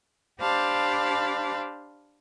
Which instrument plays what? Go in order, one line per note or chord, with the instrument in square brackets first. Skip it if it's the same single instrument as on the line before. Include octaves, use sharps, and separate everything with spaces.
[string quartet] D4 G4 C5 F5 A5 B5